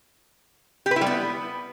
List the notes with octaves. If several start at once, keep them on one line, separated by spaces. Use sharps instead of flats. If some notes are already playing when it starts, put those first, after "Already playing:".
G4
B4
E4
G3
B3